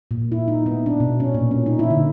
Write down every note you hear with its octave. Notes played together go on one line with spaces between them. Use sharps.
A#2
E4
D#4
B3
D4
B2
C#4
A#2
C#4
D#4
E4
D3